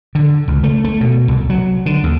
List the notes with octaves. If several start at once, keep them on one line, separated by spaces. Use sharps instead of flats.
D3
C#2
A3
A3
B2
C2
F#3
D3
D#2